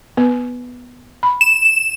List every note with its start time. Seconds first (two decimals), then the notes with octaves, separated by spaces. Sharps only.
0.17 B3 B4
1.23 B5
1.41 E7